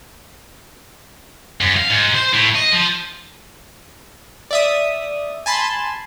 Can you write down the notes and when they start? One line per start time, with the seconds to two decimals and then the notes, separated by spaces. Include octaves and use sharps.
1.61 F#2
1.77 F5
1.90 G#2
2.15 C5
2.33 A2
2.55 D#5
2.72 F3
4.51 D5 E5 D#6
5.46 G#5 A5 B5 C6